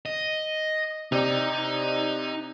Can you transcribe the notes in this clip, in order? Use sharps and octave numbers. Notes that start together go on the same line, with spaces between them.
D#5
C3 D#4 D5